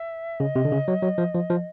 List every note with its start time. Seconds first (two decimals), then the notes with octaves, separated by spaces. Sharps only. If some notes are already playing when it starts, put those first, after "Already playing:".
Already playing: E5
0.40 C#3 D#5
0.56 C3
0.65 D3
0.72 C#3
0.88 F#3
1.02 F#3
1.18 F3
1.34 F3
1.50 F3